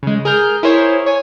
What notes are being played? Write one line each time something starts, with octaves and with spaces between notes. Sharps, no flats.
C#3 G#3
G#4 A#4 F6 G6
E4 G#4 A#4 C5 C#5 C6
C#5 G#5